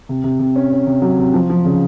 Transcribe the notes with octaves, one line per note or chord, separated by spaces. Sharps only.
C3
C3
C3
C#4
C#4
C3
F#3
C3
F3
F3
C#3